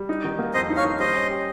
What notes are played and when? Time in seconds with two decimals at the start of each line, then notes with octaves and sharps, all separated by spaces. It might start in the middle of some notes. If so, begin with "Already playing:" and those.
Already playing: G3
0.09 D#4
0.24 D#3
0.39 A#3
0.54 F2 C5 D#5
0.70 D#4
0.77 C#5 F5
0.84 D#3
0.99 G3 C5 D#5
1.15 C#4
1.30 G4